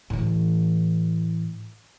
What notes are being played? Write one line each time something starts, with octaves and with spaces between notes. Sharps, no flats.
A2 E3